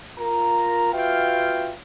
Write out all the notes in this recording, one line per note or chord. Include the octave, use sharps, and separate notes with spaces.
F4 A#4 A#5
F4 F#4 B4 E5 F5 G5